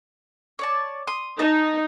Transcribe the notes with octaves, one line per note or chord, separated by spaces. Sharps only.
C#5 D5 A5
C6 D#6
D#4 D#5 A5